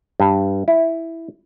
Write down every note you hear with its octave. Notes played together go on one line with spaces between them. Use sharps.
G2
E4